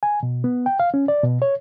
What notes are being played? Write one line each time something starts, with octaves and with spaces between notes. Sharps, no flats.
G#5
B2
B3
G5
F5
C#4
D5
B2
C#5